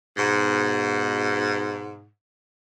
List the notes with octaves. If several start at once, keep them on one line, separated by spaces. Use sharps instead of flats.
G#2 B2